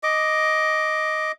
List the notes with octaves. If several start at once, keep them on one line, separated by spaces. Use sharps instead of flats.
D#5 D6